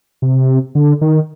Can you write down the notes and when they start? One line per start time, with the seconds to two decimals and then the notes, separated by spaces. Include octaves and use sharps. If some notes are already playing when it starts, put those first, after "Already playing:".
0.22 C3
0.75 D3
1.01 D#3